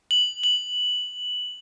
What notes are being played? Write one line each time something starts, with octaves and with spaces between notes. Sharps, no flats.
F#7
F#7